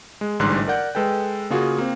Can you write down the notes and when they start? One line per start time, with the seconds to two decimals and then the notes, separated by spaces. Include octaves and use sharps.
0.21 G#3
0.40 A1 G#2 D3 G3 C6 F#6
0.68 A#4 D5 F#5 G6
0.95 G#3 A4 B4 G5
1.50 C#3 A#3 F4 F#4 G#4
1.78 A#3 C4